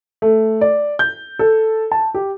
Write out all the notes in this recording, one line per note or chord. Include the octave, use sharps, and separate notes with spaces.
A3
D5
G6
A4
A5
G4